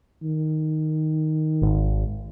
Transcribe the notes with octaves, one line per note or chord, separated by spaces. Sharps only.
D#3
G#1